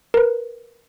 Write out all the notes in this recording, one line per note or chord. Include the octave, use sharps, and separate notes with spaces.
A#4 B4